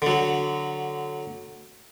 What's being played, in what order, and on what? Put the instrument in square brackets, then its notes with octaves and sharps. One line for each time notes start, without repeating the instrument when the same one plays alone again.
[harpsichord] D3 F#3